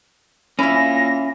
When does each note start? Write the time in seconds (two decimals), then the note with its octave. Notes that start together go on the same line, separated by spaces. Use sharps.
0.59 A#3 C#4 E4 F4 E5 A#6